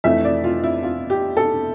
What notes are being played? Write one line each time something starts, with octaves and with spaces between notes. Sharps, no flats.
F2 E3 A3 E5
D5
F4
E4
F4
G4
A4